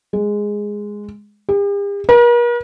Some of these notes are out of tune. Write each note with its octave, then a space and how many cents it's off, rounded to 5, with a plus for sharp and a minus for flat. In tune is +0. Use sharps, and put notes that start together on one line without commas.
G#3 -5
G4 +45
A#4 +45